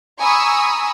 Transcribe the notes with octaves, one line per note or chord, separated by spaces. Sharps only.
G#5 A#5 B5 C#6 D#6 E6